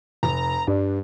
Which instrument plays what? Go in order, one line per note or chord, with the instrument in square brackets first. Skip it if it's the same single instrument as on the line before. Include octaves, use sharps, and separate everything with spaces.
[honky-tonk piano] F1 [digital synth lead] A#5
[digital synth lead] G2 [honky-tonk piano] D4